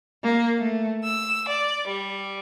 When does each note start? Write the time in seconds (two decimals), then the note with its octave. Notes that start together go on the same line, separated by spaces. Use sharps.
0.23 A#3
0.59 A3
1.04 E6
1.48 D5
1.88 G3